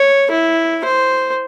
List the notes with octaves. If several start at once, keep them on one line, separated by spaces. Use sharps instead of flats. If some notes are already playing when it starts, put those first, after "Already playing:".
Already playing: C#5
E4
C5